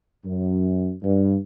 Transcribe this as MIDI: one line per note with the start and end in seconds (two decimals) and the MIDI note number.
0.24 0.91 42
1.03 1.36 43